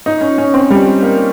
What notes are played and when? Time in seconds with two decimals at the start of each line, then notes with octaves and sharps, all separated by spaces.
0.06 D#4
0.21 C#4
0.38 C#4
0.54 C4
0.70 G3
1.02 A#3